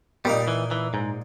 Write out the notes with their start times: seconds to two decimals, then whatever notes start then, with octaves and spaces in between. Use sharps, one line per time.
0.25 A#2 G3 A#3 D#4
0.48 E3
0.71 E3
0.94 G#2